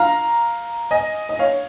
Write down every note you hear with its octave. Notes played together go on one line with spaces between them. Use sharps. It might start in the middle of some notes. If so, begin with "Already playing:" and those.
Already playing: F5 A#5
D#5 G#5
D#5
C#5 F5